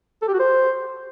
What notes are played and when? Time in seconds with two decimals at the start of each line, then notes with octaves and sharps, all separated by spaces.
0.22 A4
0.28 G4
0.34 F#4
0.40 C5